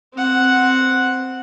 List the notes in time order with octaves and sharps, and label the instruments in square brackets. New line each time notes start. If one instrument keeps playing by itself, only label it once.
[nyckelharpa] C4 F#5